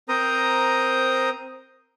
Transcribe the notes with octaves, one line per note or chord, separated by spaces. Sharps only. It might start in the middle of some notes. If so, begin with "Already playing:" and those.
C4 A#4 C5 A#5 D#6